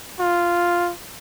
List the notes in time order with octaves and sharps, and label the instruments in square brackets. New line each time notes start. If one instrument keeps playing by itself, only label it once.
[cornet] F4